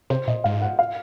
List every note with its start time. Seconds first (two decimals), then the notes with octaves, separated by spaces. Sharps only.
0.10 C3 C5
0.27 A#2 D#5
0.44 G#2 F5
0.62 F#5
0.79 F5